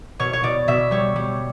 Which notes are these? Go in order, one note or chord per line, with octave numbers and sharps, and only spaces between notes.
B2 C#5
C#5
B2 D5
B2 E5
G3 C#5
G3